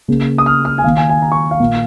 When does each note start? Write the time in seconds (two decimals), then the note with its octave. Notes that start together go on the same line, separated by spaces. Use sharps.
0.08 C#3 A#3
0.38 D#6
0.46 F6
0.65 F6
0.78 G#5
0.84 D#3 A#3 F5
0.97 G#5
1.09 G#5
1.22 A#5
1.32 C#6
1.51 F5
1.60 A#2 A#3